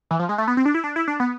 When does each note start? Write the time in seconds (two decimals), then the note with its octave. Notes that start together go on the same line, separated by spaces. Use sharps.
0.11 E3
0.19 F3
0.29 G#3
0.38 A3
0.48 B3
0.57 C4
0.65 D4
0.74 E4
0.84 D4
0.96 E4
1.08 D4
1.20 B3